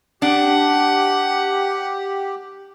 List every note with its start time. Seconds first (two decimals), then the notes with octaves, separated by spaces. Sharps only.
0.22 D4 G4 F#5